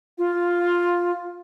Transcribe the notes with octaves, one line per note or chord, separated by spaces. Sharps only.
F4